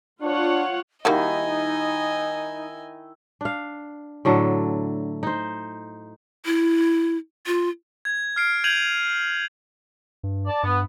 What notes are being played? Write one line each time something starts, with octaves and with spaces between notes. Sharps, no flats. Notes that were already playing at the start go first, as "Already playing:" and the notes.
D4 F4 C#5 F#5
D#3 G3 A#3 D#4 E4 F#4 D#5 G#5
D4 F5
A2 D3 F#3 A4
D#4 C5
E4
F4
G#6
F6 C7 D7
G6 G#6 D#7 F7 F#7
G2
D5 A5
G2 B3